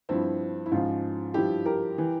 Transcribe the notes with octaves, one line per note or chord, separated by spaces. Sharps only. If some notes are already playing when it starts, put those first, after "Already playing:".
G2 F3 C4 E4
E4
G#2 F3 C#4 F4
G2 F3 E4 G4
G4 A#4
E3